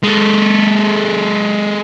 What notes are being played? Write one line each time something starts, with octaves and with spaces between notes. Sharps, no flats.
G#3 A4